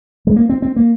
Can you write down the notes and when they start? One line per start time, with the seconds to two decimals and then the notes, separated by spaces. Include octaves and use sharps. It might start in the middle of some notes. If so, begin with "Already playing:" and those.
0.27 G#3
0.36 A#3
0.49 C4
0.62 C4
0.76 A#3